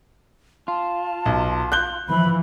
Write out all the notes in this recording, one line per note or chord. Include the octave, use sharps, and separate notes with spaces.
F4 A5
B1
F#6 G6 G7
E3 F3 B5